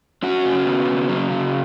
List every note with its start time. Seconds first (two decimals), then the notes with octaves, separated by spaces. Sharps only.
0.23 F#3 C#4 F#4
0.45 C#3
0.66 B3
0.88 C#3
1.09 F#3
1.31 C#3